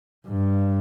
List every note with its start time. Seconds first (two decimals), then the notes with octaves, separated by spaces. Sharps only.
0.28 G2